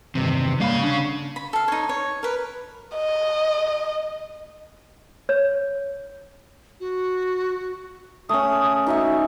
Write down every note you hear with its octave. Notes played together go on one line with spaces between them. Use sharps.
E2 G2 C3 D#3
C#3 G3 A#3 F5 B5
D3 D4
B5
A4 F5
D#4 C#5
C#5
A#4 B4
D#5
C#5
F#4
A3 C#4 D#6
D#4 F#4 E5 G#5